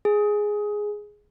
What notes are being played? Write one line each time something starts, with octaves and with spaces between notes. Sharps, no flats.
G#4